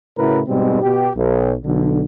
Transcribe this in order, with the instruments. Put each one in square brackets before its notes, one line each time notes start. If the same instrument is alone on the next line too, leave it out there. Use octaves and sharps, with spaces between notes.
[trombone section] A2 C#3 E4 F#4 A#4 B4
G#2 B2 G3 G#3 C4
B2 G4
B1
B1 D3